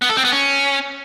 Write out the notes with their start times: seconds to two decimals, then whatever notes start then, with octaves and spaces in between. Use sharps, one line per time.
0.02 B3
0.09 A4
0.17 C4
0.25 B3
0.32 C#4